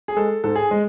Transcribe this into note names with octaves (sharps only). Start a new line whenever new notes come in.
G#4
G#3 A4
G#2 A4
G#4
G#3